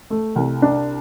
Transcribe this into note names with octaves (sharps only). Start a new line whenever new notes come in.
A3
C2
D4